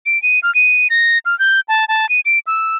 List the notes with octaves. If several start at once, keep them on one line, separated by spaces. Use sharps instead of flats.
D7
D#7
F6
D#7
A#6
F6
G6
A5
A5
D#7
D7
E6